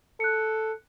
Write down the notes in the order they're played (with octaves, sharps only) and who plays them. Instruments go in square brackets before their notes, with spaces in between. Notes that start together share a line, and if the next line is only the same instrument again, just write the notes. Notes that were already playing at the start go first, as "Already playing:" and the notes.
[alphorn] A4 [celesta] F#6 C#7